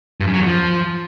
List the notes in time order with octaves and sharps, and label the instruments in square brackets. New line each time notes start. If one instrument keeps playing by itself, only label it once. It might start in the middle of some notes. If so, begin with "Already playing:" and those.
[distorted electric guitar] G2
F#2
F#3
E2
F3